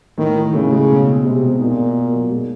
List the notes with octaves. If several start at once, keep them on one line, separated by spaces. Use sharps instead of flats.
A2 D#3
E3
A2 C#3
G#3
B2
C4
C3 G#3
B2
A#2 D#4
B2
A#3
F#3
G#3